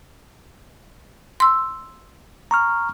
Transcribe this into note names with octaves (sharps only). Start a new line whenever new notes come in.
C6 E6
A#5 C#6 F6